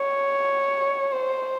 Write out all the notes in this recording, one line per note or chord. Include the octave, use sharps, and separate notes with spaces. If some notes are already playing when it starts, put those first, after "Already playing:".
Already playing: C#5
C5